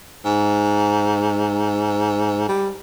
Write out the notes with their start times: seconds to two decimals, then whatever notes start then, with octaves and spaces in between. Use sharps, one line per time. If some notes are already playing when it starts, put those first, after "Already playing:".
0.25 G#2
2.49 G3